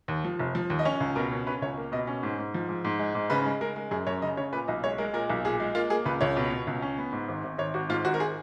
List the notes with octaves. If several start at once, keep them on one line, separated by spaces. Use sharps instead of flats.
D#2
F3
F1
F3
D#2
D#5
C#4 C#5
C#2
B2 A#4
C#4
C#4 B4
C#2 C#5
A#3
B2 D#5
C#4
G#2
G#2
F3
G#2
G#2
G#3
G#2
C#3 B4
G#3
G#3 A#4
G#3
F#2 G#4
F#2 C#5
C#3 D#5
C#3 C#5
A#2 B4
B1 D#5
G#3 C#5
G#3 A#4
A#2 A#4
B1
A#2 G#4
G#3
A#3 F4
A#3 G#4
C#2 B4
C#2 C#5
B2
B2
C#2
C#4
B3
G#2
G#1
G#1
G#1 C#5
G#1 F#4
G#2 F4
G#1 F#4
A#4
G#4